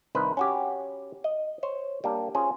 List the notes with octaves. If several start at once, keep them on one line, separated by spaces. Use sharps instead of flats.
C2 D#3 B4 C5
C#4 F#4 G4
D#5
C5 C#5
G3 A#3 D4
C#4 F4 G#4 C5